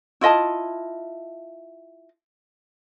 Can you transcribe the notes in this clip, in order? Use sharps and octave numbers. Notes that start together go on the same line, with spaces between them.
E4 F4 D#5 A5